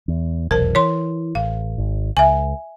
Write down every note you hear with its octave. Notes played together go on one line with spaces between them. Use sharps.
E2
F1 B1 E2 A#4 C5 A5
E3 C#5 C6
A1 F5
G#1
C#2 E5 G#5